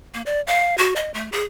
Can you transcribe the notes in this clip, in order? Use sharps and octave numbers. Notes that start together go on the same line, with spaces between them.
A#3
D5
F5
F#4
D#5
A3
G#4